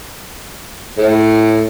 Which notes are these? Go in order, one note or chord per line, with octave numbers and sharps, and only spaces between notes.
A2